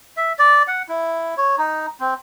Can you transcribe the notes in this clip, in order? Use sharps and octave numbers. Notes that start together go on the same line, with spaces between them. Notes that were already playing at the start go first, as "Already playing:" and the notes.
E5
D5
F#5
E4
C#5
D#4
C4